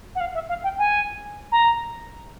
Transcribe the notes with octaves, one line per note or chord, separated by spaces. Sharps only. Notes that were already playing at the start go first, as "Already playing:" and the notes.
F#5
F5
E5
F5
G5
G#5
A#5